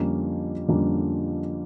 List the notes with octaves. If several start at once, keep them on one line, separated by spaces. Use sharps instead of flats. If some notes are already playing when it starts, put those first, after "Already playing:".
Already playing: F2 D3 G3 A#3 C#4
F2 D3 G3 A#3 C#4